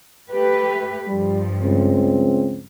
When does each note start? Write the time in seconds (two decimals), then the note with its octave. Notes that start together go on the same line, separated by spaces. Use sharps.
0.31 A3 G4 B4
1.08 G2 F3 G3
1.62 C#2 C4